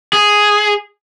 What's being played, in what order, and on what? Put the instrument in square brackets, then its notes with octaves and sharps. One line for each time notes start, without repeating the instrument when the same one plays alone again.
[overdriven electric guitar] G#4